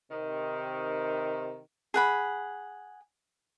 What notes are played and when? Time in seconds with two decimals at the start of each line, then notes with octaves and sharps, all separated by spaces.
0.10 C3 D#3
1.94 G#4 F#5 B5